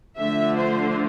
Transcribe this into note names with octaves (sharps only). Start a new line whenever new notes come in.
D3 F3 A3 E5
C5